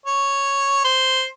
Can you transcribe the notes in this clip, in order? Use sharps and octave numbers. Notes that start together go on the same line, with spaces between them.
C#5
C5